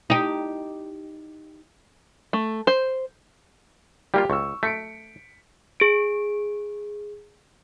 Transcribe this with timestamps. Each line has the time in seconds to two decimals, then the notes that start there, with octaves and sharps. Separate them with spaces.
0.10 D#4 G4
2.33 A3
2.67 C5
4.14 G3 A#3 F4 G4
4.30 C#2 C#6 E6
4.63 A3 B6 C#7 D7
5.80 G#4 D7